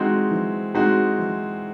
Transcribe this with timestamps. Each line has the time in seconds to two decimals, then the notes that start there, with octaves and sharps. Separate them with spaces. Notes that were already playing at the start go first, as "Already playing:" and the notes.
Already playing: E3 G#3 C4 D#4 F#4
0.31 E3
0.74 G#3 C4 D#4 F#4
1.18 E3